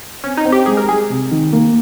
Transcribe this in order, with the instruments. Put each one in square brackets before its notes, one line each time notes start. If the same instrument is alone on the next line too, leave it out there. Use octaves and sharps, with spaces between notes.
[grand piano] C4 [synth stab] C#4
[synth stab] D#4
[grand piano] C4
[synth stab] G4
[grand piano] G#3 [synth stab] G#4
[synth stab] A#4
[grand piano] G#3 [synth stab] G#4
[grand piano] C3
D#3
A#3